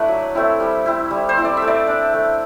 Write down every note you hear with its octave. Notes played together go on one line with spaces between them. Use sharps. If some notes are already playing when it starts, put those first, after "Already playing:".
Already playing: A3 D4 E4 B4 D5
F#3
A3 C4 E4
G3
C4 E4
G3
C5
C4 E4
D5
E5
A3
D5
D4
A3